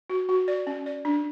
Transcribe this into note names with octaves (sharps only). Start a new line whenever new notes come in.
F#4
F#4
D5
C#4
D5
D4